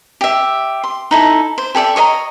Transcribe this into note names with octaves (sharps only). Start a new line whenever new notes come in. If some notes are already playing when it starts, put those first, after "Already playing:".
G4 E5
C6
D#4 E4 A4
C5
G4 A4 D5 E5
C#5 D#5 E5 A#5